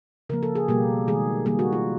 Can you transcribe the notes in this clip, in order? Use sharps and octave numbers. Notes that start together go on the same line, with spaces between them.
C#3 F3 A#3 A#4
A4
G#4
B2 G3 A#3 G4
D#3 G#3 G#4
D#3 G3 A#3 G#4
F#4
F4